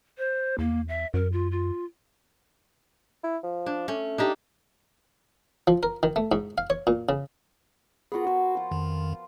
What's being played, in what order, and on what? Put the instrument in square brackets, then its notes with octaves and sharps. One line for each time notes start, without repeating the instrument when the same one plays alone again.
[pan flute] C5
[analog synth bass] E2 [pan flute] A#3
[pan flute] E5
[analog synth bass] F#2 [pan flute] A#4
[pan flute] F4
F4
[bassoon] E4
F3
[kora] D4
[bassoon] A3 [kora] C#4
[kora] D4 D#4 G4
[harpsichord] F3
A#4
D#3
A3
G#2
F5
C#5
A#2
C#3
[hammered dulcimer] B3 F#4 A#4 [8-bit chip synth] F4 G#4
[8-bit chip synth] F#4 [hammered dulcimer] C5 A5
[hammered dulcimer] F3 F4
[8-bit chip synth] F2 D#3